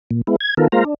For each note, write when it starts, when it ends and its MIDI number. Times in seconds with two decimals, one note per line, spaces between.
0.11 0.22 46
0.27 0.36 56
0.27 0.36 59
0.27 0.36 64
0.41 0.54 92
0.57 0.68 51
0.57 0.68 59
0.57 0.68 65
0.57 0.68 69
0.57 0.68 70
0.72 0.84 56
0.72 0.84 58
0.72 0.84 65
0.72 0.84 72
0.72 0.84 77
0.72 0.84 82
0.85 0.94 62